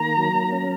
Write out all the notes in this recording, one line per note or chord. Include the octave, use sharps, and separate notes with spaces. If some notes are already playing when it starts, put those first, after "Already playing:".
Already playing: D#3 A#3 A#5
F#3
C#4